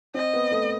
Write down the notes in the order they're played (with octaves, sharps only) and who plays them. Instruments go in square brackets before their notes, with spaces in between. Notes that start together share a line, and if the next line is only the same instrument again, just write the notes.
[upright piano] C4 [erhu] D#5
[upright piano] B3
A3